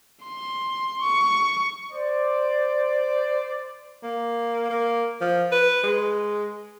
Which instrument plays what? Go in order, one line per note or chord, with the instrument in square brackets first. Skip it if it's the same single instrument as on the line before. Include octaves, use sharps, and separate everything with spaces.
[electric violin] C6
C#6
[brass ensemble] C5 D5
[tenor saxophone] A#3
A#3
F3
B4
G#3